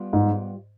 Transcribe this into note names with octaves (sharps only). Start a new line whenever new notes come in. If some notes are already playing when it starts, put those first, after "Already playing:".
Already playing: G3 B3 F4
G#2